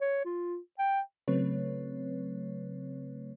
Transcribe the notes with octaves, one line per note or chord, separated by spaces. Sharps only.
C#5
F4
G5
C#3 F#3 A3 C4 B4 C#5